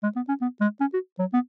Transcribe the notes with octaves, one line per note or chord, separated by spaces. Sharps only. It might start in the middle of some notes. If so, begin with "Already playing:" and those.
G#3
B3
C#4
B3
G#3
C#4
F#4
F#3
B3